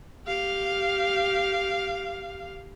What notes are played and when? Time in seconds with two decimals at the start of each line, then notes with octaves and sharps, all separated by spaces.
0.27 G4 F5